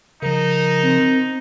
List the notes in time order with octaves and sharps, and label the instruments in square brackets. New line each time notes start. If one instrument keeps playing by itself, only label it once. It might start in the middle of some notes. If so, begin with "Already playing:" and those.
[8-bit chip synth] C#3 F3 [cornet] D#4 [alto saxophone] A#4
[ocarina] C4